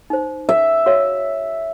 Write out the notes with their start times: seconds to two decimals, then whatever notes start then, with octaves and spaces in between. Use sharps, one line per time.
0.10 D#4 C5
0.49 E5
0.86 F#4 C#5 F5